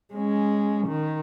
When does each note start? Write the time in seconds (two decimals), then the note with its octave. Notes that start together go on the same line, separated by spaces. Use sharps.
0.14 G#3 C#4
0.87 D#3